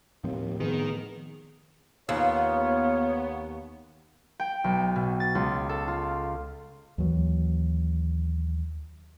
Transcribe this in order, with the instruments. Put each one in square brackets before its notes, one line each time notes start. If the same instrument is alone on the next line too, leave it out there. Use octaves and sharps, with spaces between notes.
[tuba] D#2 [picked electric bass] A2 F3 C4
[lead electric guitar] D#3 [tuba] B3 [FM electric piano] G#4 B4
[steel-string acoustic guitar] D#2 [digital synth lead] B3 [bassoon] F4 [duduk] C#5
[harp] G5
B1
B2
A6
C#2
A4
F4
[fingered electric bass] D#2 E3 F#3